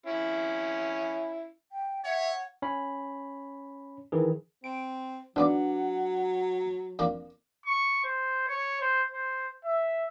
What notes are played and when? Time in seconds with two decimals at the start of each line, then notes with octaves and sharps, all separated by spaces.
0.06 C#4 E4
1.72 G5
2.05 C#5 E5 F#5
2.62 C#4 C#5 B5
4.12 D#3 E3 G#4
4.64 C4 D7
5.36 G#2 F#3 B3 D4 B4 D5 F#5
6.99 F2 A#3 D4
7.66 C#6
8.04 C5
8.48 C#5
8.81 C5
9.14 C5
9.65 E5